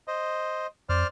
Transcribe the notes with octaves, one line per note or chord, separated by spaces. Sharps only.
C5 D#5
F2 C5 D5 F6